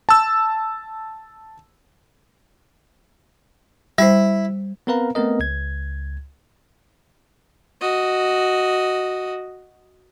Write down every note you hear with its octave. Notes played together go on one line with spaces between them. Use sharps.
A5 E6
G3 E4 C5
B3 C4 A#4 B4 F5 A#5
A3 B3 C4 A#4 D#5
C#2 G#6
F#4 D#5